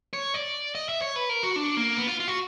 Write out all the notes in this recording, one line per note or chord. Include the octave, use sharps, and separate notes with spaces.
C#5
D5
D#5
E5
C#5
B4
A#4
F#4
D4
A#3
B3
F4
F4
F#4